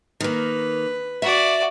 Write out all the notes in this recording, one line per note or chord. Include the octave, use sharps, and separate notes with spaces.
D#3 A#3 B4
F#4 D5 E5